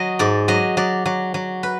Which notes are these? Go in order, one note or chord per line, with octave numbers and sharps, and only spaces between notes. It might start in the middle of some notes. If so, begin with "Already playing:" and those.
Already playing: F#3 D#5
G#2 D5
F#3 D#5
F#3 D5
F#3
F#3
B4